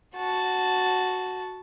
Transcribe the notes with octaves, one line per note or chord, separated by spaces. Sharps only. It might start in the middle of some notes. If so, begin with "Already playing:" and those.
F#4 A5